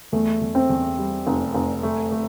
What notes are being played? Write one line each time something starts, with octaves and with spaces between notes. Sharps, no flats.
E2 A3
E2
C4
E2
G3
F1
F1
A3
A3